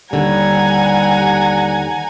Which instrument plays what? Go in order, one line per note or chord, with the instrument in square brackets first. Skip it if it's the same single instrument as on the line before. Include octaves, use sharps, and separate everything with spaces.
[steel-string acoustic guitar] D#2 D3 [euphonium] G3 [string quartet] F#5 G#5 A#5